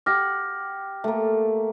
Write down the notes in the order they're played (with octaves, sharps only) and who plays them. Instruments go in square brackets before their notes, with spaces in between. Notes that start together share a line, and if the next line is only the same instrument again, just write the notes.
[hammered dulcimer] G4 F#5 [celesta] D6 F6 A#6
[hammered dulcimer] A3 A#3